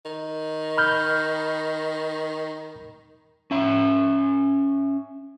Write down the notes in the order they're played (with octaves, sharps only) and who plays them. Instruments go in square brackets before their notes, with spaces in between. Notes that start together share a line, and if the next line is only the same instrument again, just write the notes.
[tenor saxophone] D#3
[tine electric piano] B5 F6 G6
[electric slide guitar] C#4 E5